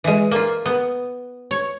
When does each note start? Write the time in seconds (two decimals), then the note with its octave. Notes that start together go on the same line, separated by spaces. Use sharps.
0.04 E3 G#3
0.31 A#3 F4
0.66 B3
1.51 C#5